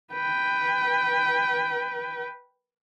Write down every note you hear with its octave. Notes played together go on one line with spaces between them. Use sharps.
B4 G5